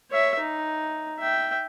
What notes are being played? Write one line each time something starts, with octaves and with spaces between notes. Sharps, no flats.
C#5 E5
D#4
E5 G5